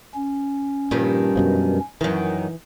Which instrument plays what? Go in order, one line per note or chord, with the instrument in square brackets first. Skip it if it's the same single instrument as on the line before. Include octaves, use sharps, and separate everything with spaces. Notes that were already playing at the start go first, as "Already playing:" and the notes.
[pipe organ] C#4
[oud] G2 D#3 [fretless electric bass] A#2 F3
[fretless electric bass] F#2 B2 F3
[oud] F#2 D#3 [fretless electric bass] E3